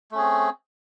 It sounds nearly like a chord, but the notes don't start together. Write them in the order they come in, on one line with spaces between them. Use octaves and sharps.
A3 C#4 G#4 C4